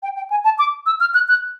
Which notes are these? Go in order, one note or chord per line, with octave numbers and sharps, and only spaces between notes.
G5
G5
G#5
A5
D6
E6
F6
F#6
F#6